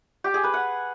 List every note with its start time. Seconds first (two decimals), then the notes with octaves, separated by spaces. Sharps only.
0.24 G4
0.34 G#4
0.44 B4
0.54 F#5